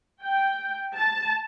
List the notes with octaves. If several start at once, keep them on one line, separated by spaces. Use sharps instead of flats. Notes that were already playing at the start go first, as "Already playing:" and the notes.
G5
A5